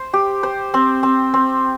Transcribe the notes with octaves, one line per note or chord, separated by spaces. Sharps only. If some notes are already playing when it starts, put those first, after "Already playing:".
Already playing: C5
G4
C5
C4
C4
C4